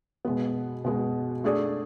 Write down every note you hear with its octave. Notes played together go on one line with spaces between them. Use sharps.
B2 G#3 B3
B2 G#3 B3
A3 D4 G#4 D5